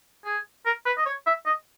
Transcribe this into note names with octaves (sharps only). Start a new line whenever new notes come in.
G#4
A#4
B4
D#5
C#5
E5
D#5